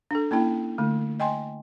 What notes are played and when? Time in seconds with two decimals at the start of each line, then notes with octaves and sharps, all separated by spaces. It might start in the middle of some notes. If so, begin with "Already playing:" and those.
0.11 D4 A4
0.31 A#3 C#4 E4 G5
0.78 D3 A3
1.20 D#5 G5 G#5 C6